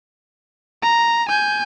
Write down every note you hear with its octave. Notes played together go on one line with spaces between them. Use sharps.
A#5
G#5 G6